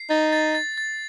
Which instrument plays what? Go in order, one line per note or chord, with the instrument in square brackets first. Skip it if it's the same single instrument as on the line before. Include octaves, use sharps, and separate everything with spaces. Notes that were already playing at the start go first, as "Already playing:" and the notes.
Already playing: [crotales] C7
[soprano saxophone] D#4 [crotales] A6
[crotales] A6
A6
A6